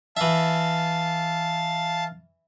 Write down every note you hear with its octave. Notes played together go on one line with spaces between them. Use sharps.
E3 E5 F5 A5